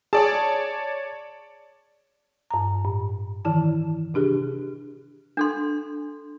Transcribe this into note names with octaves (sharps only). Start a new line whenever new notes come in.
G#4 C#5 D5 A5
G2 A#5
A2
D#3 E3 E4 A5
C3 D4 G4 G#4
D4 A4 C6